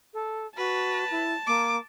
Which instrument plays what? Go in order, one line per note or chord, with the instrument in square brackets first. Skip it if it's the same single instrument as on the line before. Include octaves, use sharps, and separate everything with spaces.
[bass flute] A4
[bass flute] F#4 [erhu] B4 [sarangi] A5
[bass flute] E4
[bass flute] A#3 [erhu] D6